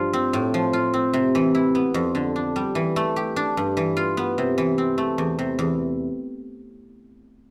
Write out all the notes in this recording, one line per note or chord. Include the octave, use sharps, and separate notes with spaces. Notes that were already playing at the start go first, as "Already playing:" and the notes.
Already playing: G2 F3 F4
C4
A2
F3
F4
C4
C3
E3
E4
B3
F2
D3
D4
G3
E3
A3
G4
D4
G2
E3
F4
B3
C3
E3
C4
A3
E2
C3
E2